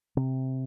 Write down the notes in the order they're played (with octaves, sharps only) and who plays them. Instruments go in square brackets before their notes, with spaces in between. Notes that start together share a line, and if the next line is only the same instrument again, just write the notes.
[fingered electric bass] C3